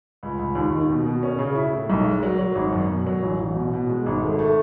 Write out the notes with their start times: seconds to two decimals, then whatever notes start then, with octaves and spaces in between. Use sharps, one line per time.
0.23 C#2
0.39 C#2
0.55 D#2
0.72 D#3
0.89 B2
1.06 B2
1.23 C#4
1.39 C#3
1.55 E4
1.73 A2
1.90 B1
2.06 G#3
2.23 F#3
2.39 F#3
2.55 G#1
2.73 F#2
2.89 B2
3.06 F#3
3.23 A1
3.39 A1
3.55 B2
3.73 B2
3.89 G#3
4.06 G#1
4.23 A3
4.39 A3